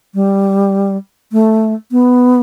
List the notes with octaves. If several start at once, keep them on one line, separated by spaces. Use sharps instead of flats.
G3
A3
B3